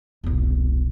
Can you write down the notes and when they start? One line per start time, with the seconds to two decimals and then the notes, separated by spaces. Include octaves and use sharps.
0.24 E1 C2